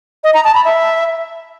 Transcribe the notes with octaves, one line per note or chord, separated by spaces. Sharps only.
D#5
A#5
A5
B5
E5